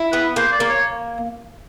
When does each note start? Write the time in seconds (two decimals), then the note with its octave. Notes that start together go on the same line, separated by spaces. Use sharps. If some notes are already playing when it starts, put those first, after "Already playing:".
Already playing: E4
0.12 B3 B4
0.36 A#3 C5
0.52 D5
0.60 A#3
0.69 C#5